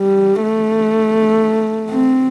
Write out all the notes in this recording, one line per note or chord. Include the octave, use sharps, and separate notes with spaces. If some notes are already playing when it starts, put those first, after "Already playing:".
Already playing: G3
A3
C4